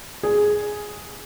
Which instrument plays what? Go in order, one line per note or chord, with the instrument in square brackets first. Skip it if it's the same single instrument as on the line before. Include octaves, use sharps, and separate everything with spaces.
[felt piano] G#4